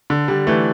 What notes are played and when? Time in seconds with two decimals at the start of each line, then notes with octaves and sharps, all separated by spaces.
0.10 D3
0.28 D3 G3
0.47 E3 A3